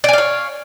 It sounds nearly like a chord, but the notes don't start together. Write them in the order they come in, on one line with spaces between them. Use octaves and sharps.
D5 G#5 F5 C#5